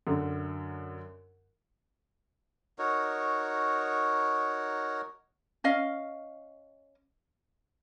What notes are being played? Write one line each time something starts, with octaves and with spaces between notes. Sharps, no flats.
F#2 D3
D#4 F#4 A#4 C#5
C#4 D#5 F5